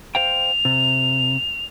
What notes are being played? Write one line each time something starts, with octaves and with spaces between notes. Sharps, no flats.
C5 F5 G5 F7
C3